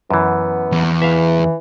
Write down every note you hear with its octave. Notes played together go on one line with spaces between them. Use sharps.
F#2 E3 B3
E2
E3 E5 F5